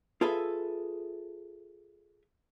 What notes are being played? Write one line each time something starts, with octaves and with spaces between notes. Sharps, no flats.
F4 G#4 A4 B4 E5